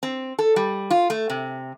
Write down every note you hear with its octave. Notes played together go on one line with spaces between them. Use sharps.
C4
A4
G3
F4
A3
C3